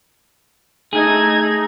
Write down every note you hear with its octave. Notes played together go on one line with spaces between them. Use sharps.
A3 D#4 G#4 G#6